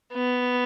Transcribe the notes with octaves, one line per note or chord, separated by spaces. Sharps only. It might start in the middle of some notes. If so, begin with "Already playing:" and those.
B3